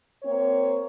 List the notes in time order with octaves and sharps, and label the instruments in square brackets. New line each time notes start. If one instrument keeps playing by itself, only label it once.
[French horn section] A#3 C4 C#5